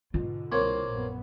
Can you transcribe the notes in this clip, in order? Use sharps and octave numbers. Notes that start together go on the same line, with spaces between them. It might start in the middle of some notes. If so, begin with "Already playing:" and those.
G#2 B2 D3 F4
C2 A#3 C4 C#5
A#1 F#2 B3